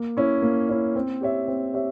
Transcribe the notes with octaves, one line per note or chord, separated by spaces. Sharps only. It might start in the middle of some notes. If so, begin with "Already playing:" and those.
Already playing: A#3
C#4 E4
A#3
C#4 E4
C4
G4 C#5 E5
C4
G4 C#5 E5